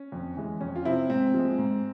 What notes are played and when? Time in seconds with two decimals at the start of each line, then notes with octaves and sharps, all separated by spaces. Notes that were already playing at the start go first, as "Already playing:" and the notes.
Already playing: C#4
0.12 F2
0.37 E3 G#3
0.61 F2 C#4
0.75 F4
0.85 C3 F3 C4 E4
1.10 G#2 C4
1.34 F3 G#3
1.58 G#2